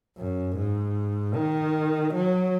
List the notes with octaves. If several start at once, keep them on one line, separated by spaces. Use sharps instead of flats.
F#2
G#2
D#3
F#3